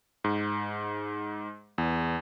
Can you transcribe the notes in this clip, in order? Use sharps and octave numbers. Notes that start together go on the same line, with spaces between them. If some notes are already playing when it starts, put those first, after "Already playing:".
G#2
E2